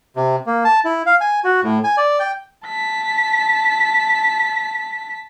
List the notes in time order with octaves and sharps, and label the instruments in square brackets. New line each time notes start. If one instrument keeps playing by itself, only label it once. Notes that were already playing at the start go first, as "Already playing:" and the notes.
[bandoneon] C3
A#3
A5
E4
F5
G#5
F#4
A2
G#5
D5
G5
[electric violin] A5 B6